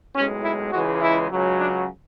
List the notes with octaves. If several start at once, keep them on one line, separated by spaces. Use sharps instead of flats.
B1 A2 G#3 C#4
E4
C#2 C#3 E3 G#3 F#4
E4
C#2 C#3 F#3
D4